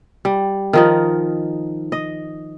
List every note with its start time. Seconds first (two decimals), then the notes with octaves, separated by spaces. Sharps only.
0.25 G3
0.73 D#3 F3 D#4
1.92 D#5